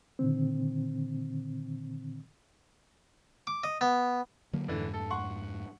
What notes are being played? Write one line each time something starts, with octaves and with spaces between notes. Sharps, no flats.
A#2 D3 D#3 C4
D6
D#5
B3
D3 F#3 A#3
F2 G#2 D3 E3
A4
F#5 C6 C#6